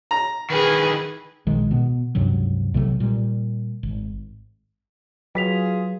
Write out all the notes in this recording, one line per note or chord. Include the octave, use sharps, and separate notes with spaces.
A#5
D#3 E3 G#4 B4
A#1 D#3 G#3
B2 B3
C#2 G2 C3 F#3
B1 C3 F#3 A3
A#2 G3
G#1
F#3 F4 G#4 B4 B6 F7